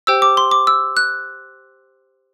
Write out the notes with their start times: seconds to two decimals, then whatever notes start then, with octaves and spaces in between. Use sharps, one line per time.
0.07 G4 C5 G5 E6
0.22 D6
0.37 C6
0.51 D6
0.67 E6
0.97 F#6